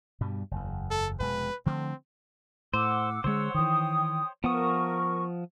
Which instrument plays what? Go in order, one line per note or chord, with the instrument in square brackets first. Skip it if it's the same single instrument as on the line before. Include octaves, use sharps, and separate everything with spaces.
[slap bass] G2 B2 G3
F#1 E2
[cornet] A4
[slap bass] F1 B2 G#3 [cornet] B4
[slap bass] D3 F3 A3 [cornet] C4
[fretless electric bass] A2 [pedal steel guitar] C5 [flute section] F#5 D6 E6
[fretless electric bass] D3 D#3 G#3 [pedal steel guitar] C5 C#5 [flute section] F#5 E6
[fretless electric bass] D#3 E3 [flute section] G5 D#6
[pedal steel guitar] F3 F#5 D#6 [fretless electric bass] B3 [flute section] A#4 C#6